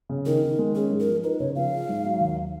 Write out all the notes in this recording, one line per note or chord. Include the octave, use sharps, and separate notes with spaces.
C#3
D#3 A#4
D#3
G#3
C#4 G#4
G#2
A#4
F3
D#4 B4
C#3 C#5
F3 F5
G#4
G#2
F#3
D#2